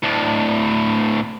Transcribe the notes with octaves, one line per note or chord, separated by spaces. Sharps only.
D2 A2